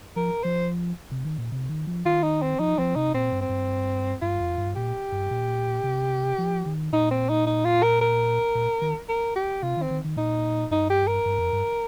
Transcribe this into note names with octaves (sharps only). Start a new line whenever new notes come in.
F3 A#4
F3 C5
C3
D#3
A#2
C3
D#3
F3
D#3 F4
D#4
C4
F3 D#4
F3 C4
C3 D#4
A#2 C4
G2
C4
G2
G2 F4
F2
G2
A#2 G4
G2
A#2
C3
F3
D#3
A#2 D#4
C4
D#4
D#4
F4
A#4
A#4
A#2
D#3
A#4
G4
C3 F4
D#3 C4
D#3
D#3
A#2 D#4
G2 D#4
G4
A#4
G2
F2
G2